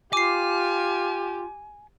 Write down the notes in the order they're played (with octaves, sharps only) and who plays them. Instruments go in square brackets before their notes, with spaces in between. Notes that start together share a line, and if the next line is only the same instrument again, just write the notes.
[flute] F4 [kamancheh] G4 [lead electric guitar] G#5 [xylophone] D6 C7